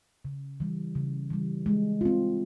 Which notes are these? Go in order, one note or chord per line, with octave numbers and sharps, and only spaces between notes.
C#3
E3 G3
C#3
E3 G3
G#3
C4 F4